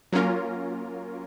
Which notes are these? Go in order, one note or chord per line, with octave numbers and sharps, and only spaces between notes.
F#3 A#3 C#4 F4 A#4